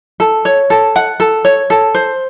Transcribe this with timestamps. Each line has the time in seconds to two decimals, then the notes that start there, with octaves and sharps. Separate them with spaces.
0.20 A4
0.45 C#5
0.70 A4
0.96 F#5
1.20 A4
1.45 C#5
1.70 A4
1.95 C5